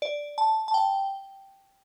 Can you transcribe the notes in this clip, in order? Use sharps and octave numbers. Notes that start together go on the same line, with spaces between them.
D5
A5
A5
G5